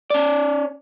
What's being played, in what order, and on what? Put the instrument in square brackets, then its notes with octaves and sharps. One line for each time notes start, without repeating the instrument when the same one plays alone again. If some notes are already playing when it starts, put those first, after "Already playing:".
[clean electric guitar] C#4 D5